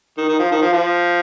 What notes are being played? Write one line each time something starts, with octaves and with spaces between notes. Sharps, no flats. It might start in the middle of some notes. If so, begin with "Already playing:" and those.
D#3
D#3
F3
D#3
F3
F3